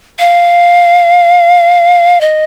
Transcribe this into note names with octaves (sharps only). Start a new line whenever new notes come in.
F5
D#5